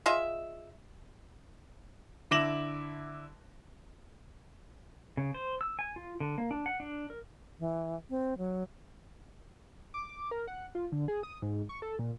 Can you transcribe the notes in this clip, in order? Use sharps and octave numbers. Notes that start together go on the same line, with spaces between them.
F4 G#4 D#5 E5
D3 E4 D6 A#6 E7 F#7
C#3
C5
E6
G#5
F4
D3
A#3
D4
F#5
D4
A#4
E3
C4
F#3
D6
D6
A#4
F#5
F4
D3
G#4
D#6
G#2
C#6
A4
A#2